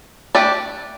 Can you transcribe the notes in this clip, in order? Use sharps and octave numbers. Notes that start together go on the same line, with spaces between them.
A3 D4 G4 D5